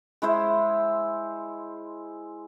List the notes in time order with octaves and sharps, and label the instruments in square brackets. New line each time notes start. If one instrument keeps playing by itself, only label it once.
[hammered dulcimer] G#3 E4 C5 E5